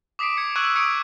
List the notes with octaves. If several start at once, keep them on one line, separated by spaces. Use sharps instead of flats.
D6 D#6 B6 C7 D7
G#6 C#7
C#6 E6 F#6 G#6 D#7 F#7
C#6 D#6 G#6 C#7 D7